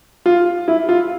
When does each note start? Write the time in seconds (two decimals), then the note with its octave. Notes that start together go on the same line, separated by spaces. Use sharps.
0.26 F4
0.68 E4
0.89 F4